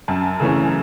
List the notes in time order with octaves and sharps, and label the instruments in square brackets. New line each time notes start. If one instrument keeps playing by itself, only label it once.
[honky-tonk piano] F#2 A5
C#3 E3 A3 C#4